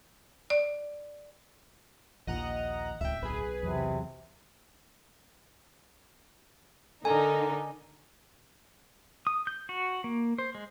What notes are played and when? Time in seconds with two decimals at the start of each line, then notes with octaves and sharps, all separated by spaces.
0.50 D5
2.27 A#1 D#2 A#2 F3 D#5 F#5 A#5
3.01 D1 C#2 E5 G5
3.23 B1 G#4 B4
3.63 E2 C3 F#3
7.05 D3 D4 D#4 A4 A#4 G#5
9.27 D#6
9.47 G6
9.69 F#4
10.04 A#3
10.38 C5
10.55 G#3